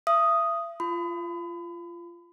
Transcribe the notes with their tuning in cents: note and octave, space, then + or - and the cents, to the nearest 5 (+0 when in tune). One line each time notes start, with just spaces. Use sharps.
E5 +40 D#6 +0
F4 -20 B5 +35